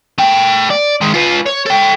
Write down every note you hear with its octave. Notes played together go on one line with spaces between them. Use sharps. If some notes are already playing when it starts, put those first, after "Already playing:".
A3 G5
D5
D#3 G#3
F4 B4
C#5
A4 G5